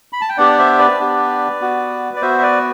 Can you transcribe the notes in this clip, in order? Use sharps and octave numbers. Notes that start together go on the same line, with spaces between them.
B5
A5
G5
B3 D4 G4 D5 F#5
C5 E5
B4 D5
B3 D4 G4
B3 F#4
D5
B3 F#4 C5 E5
E5
B4 D5